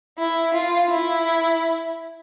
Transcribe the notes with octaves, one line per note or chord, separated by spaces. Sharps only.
E4
F4
E4